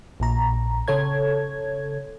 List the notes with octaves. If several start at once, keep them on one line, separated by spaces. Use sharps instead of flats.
A#1 A#2 A#5
C#3 A4 C#5 G#6